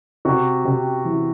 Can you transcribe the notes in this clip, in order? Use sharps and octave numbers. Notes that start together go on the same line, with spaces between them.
C3 F#4
C3 G4
E3